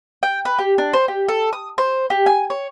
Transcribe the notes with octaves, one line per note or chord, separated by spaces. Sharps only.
G5
B4
G4
D4
C5
G4
A4
D#6
C5
G4
G#5
C#5